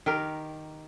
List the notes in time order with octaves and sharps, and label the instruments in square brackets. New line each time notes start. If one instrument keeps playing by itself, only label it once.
[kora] D#3 G4 A#4